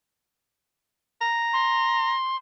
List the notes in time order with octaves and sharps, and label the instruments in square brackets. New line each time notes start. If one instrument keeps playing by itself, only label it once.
[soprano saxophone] A#5
[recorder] C6